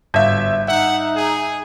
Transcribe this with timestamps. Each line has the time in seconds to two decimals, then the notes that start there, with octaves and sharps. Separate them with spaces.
0.14 G1 G#2 G3 E5 F5 G6
0.68 D#4 E5 F#5
1.16 G#4